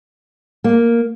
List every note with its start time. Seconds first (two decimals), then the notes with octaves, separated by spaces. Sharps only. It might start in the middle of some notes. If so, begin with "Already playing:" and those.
0.64 A#3